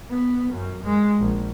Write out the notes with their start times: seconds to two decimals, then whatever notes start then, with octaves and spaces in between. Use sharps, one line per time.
0.11 B3
0.53 F#2
0.84 G#3
1.19 A#1